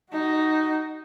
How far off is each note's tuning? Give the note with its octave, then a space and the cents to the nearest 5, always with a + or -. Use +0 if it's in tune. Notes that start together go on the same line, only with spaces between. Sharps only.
D#4 +0 F#4 +25